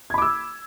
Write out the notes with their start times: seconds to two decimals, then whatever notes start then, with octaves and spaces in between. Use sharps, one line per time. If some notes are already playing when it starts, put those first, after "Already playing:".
0.10 G#6
0.14 B5
0.18 D6
0.22 E6